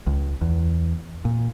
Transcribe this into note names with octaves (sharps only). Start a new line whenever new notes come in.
C#2
E2
A#2